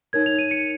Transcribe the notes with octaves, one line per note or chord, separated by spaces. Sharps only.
D#4 A#4 C#5 G#6
F7
D#7
C#7